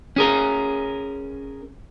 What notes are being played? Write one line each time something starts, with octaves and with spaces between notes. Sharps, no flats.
C#4 G#4 A#4